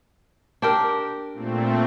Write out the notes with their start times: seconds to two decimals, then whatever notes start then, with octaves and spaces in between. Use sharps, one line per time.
0.62 D4 G4 A#4
1.33 A#2 A3 C4